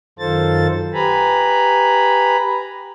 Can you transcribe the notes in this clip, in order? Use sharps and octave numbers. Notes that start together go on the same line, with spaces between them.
F#2 D#3 F4 A4 C5 A6
G4 B4 G#5 A#5 B5